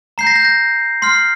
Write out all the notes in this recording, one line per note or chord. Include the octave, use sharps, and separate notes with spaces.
A#5 G6 C7
A#6
G6
A#6
C6 F6 C7